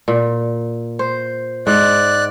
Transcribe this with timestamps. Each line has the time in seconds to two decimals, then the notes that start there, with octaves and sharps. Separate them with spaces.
0.08 A#2
0.99 C5
1.67 G#2 D5 F#6